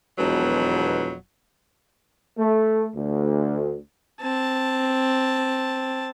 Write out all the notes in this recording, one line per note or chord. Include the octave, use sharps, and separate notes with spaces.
E1 F2 B2 F#3
A3
D2
C4 A5